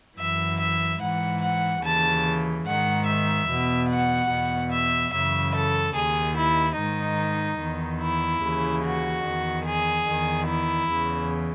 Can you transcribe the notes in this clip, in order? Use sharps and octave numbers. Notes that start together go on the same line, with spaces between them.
F#2 E3 E5
E5
G#2 E3 F#5
F#5
D#2 C#3 E3 A5
G#2 D#3 F#5
E5
E2 B2
F#5
E2 B2
E5
F#2 C#3 E3 E5
A4
D#2 D#3 G#4
E4
G#2 D#3 D#4
E2 D#3
E4
D#2 C#3 E3
F#4
E2 D#3
G#4
E2 D#3
E4
E2 C#3 E3